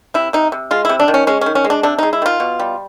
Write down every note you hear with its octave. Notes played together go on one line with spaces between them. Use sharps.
C3 E4
C3 D#4
C3
G#3 F4
C3 E4
D4
D#3
C#4
G#3 C#4
D#3 C#4
C#4
G#3
D4
C3 D4
G#3 D#4
E4
D#3 F4
B2
G3